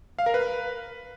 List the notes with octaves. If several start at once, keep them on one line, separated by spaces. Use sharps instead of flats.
F5
A#4
B4